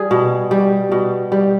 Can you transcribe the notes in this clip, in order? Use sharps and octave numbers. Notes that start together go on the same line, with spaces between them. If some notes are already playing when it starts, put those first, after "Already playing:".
Already playing: G3 G#4
B2
G3
B2
G3